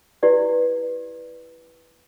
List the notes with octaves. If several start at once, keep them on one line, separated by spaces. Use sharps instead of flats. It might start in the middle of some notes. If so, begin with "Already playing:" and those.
E4 G4 B4 D5